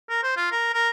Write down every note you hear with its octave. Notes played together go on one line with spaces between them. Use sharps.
A#4
C5
F4
A#4
A#4